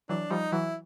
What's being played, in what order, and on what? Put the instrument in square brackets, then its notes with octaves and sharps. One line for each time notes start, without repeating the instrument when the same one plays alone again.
[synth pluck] E3 F#3 [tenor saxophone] D4
[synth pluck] F3 G3 [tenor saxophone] D#4
[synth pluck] E3 F#3 [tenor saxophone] E4